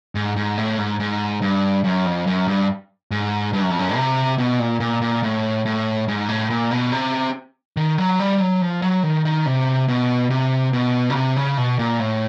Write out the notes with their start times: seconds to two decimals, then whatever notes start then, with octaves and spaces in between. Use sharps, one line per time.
0.15 G#2
0.36 G#2
0.58 A2
0.78 G#2
1.00 G#2
1.42 G2
1.84 F#2
2.06 F2
2.27 F#2
2.48 G2
3.11 G#2
3.53 G2
3.62 F#2
3.70 F2
3.79 F#2
3.96 C3
4.38 B2
4.59 A#2
4.80 A#2
5.02 A#2
5.23 A2
5.65 A2
6.08 G#2
6.29 A2
6.50 A#2
6.71 B2
6.92 C3
7.77 D#3
7.98 F#3
8.19 G3
8.40 F#3
8.61 F3
8.82 F#3
9.03 D#3
9.25 D#3
9.46 C3
9.88 B2
10.30 C3
10.73 B2
11.10 C#3
11.15 C3
11.36 C#3
11.57 B2
11.79 A#2
12.00 A2